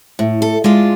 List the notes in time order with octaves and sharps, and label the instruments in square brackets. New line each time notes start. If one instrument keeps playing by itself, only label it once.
[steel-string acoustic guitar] A2
A4
G#3 D4 F4